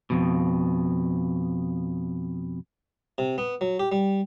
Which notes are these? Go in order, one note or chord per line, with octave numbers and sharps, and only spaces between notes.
F2 B2
C3
B3
F#3
G4
G3